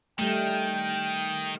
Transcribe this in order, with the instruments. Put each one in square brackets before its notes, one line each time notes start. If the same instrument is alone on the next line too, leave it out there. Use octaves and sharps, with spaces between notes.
[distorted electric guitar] D#3 [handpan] G3 A3 [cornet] G5